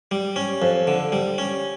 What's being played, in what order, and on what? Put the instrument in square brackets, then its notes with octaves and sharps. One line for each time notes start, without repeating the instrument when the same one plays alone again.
[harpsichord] G3
C#4
F2
D3
G3
C#4